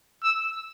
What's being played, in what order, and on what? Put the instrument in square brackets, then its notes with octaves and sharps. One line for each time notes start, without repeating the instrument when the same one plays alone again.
[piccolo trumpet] E6